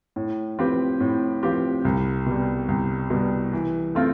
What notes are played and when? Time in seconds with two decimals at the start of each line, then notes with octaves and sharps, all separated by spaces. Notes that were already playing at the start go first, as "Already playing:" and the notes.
0.16 A2
0.59 F3 C4 G4 B4
1.00 A2
1.43 F3 C4 G4 B4
1.85 C2
2.26 B2 G3
2.68 C2
3.10 B2 G3
3.53 E3
3.95 A3 C4 F4 A4